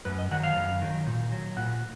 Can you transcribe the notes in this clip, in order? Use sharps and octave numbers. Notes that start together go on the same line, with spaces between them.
F#2 B4
D#5
D#3 F#3 F#5
F5
F#2
D#3 F#3
A#2
F#3
A#2 F#5